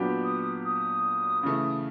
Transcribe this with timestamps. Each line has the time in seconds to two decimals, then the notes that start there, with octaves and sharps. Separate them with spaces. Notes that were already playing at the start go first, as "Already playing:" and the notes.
Already playing: A#2 F#3 B3 D4 G4
0.24 D#6
0.64 D#6
1.43 C#3 E3 A3